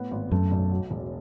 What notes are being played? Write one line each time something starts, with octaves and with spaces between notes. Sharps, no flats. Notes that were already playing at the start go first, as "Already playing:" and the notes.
Already playing: A2 B3
G#1
F#2 A3
B1
F#3
E1